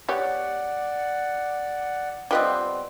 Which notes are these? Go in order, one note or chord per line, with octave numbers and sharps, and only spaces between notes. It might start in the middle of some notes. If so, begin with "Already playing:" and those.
B3 G4 C#5 D5 F#5
G3 B3 C4 F4 B4 D#5